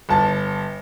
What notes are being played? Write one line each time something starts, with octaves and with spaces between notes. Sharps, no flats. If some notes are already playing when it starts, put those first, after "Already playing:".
G1 A5